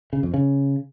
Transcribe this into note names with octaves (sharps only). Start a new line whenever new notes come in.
C#3
F2
C#3